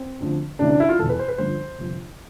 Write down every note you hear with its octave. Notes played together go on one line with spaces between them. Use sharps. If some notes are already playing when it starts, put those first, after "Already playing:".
Already playing: C4
D2 D3 F3
D2 C3 E3 D4
D4
E4
F4
E1 E2 B2 A4
B4
C5
B4
G1 G2 D3 F3 C5
G1 F2 C3